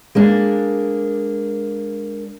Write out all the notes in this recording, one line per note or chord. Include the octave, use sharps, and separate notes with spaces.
G#3 A#3 D4